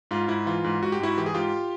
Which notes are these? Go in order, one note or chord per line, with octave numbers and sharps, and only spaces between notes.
G#2 F4
G#2 E4
E3 F4
G#2
G#2 F#4
G4
G#2 E4 F#4
E3 G4
G#4
G#2 F4 G4